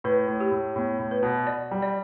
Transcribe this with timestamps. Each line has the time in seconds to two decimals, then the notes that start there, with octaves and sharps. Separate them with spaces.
0.04 A2 B4
0.28 A2
0.40 G4
0.51 A2
0.76 A2 B3
0.99 A2
1.11 B4
1.23 B2
1.47 D5
1.71 G3
1.82 D5